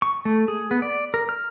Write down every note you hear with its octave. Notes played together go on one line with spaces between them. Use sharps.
C#6
A3
G#4
B3
D5
A#4
F6